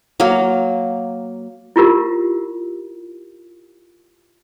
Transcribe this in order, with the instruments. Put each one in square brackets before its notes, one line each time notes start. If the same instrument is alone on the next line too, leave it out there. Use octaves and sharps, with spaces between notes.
[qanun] F#3 A#3
[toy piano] E4 F4 G4 A#4